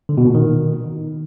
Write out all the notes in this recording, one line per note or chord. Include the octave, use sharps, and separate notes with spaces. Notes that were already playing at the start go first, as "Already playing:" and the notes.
D3
B2
A#2
D#3